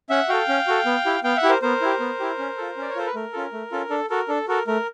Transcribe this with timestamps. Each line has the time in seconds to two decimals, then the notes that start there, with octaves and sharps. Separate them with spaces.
0.10 C#4 E5 F#5
0.29 F#4 A4 F5 G5
0.49 C#4
0.67 F#4 A4
0.86 B3
1.06 E4 G4
1.24 B3 F5 G5
1.37 E5 F#5
1.43 E4 G4
1.49 A#4 C5
1.62 B3 A#4 C5
1.81 E4 G4
2.00 B3
2.20 E4 G4
2.39 C#4
2.58 F4 A4
2.77 C#4 D5
2.90 C#5
2.96 F4 A4 C5
3.07 B4
3.15 A3 A#4
3.33 C#4 F4 A4
3.53 A3
3.72 C#4 F4 A4
3.90 D4 A4
4.10 F#4 A4 A#4
4.28 D4 A4
4.48 F#4 A4 A#4
4.67 A3 A#4